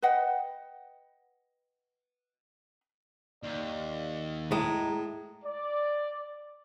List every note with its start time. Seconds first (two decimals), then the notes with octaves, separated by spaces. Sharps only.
0.02 B4 D#5 F#5 G5
3.43 D#2 D5
4.52 A2 G#3 A#5
5.44 D5